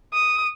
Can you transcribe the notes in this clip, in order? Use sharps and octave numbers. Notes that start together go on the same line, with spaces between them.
D#6